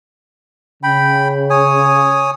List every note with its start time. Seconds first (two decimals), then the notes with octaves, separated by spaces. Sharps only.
0.83 C#3 G5 B5
1.50 C#5 G#5 D#6